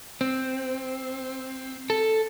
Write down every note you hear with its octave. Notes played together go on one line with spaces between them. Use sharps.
C4
A4